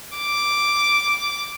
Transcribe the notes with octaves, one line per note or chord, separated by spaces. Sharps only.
D6